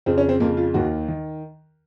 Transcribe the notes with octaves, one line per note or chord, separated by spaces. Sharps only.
F2 C#3 C4
C#4
C4
F2 C#3 A#3
F4
D#2 D#3 F#4
D#3